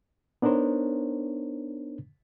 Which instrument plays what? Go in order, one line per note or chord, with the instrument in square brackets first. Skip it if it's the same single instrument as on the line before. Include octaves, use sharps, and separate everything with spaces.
[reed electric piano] B3 D4 D#4 A#4 C5 C#5